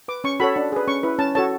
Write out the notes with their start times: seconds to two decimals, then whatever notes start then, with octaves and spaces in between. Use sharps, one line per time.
0.08 B4 D6
0.24 C#4 C#6
0.40 F#4 A4 C#5 B5
0.56 D4
0.72 G#4 B4
0.87 C#4 C#6
1.03 E4 B4
1.19 C#4 A5
1.35 F#4 A4 C#5 A5